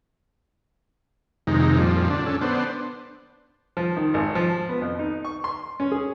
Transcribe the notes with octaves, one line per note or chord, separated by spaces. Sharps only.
F2 C3 D#3 G#3 D#4
F2 A#2 F3 G3
D3 D4
C#4 A4
B3 D4 C5
F3
D#3
G#1
F3
B3
F2
D#4
C#6
C6
C#4
G#4